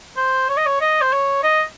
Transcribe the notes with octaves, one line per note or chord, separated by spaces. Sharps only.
C5
C#5
D#5
C#5
D#5
C5
C#5
D#5